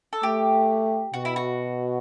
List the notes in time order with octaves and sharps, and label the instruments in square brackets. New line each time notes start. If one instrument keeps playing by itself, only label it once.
[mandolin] A4
[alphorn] A3 [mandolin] G4
[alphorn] B2 [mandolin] F#4
[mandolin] E4
F#4